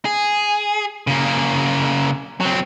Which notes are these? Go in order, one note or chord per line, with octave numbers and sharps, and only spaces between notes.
G#4
C#3 A#3
F#3 C4